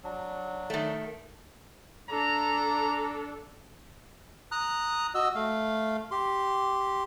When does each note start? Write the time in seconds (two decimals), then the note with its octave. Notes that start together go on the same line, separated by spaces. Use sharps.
0.04 F#3 D4
0.70 D#3 A3
2.10 D4 A4 A#5
4.52 A#5 D#6 F#6
5.15 F#4 D#5 E6
5.35 A3 F5
6.11 G4 C6